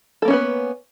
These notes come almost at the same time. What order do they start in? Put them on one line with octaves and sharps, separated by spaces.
A4 A#3 C#4 B3 B4